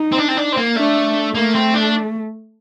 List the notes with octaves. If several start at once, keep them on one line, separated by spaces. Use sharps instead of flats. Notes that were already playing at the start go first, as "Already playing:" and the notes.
Already playing: D#4
C4
D4
C4
D4
C4
A#3
A3 D4
A3 A#3
C4
D4